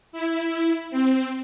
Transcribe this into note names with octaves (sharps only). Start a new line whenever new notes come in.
E4
C4